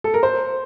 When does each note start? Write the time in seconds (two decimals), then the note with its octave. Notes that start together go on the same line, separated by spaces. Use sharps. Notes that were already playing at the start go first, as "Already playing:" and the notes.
0.04 A4
0.14 A#4
0.23 C5